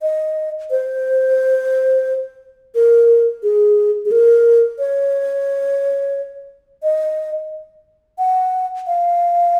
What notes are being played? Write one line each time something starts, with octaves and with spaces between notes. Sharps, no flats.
D#5
C5
A#4
G#4
G#4
A#4
C#5
D#5
F#5
F5